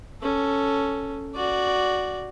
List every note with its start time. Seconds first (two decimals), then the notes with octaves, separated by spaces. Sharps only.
0.22 C#4 A4
1.35 F#4 D5